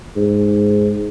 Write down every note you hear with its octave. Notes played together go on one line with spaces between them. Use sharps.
G#2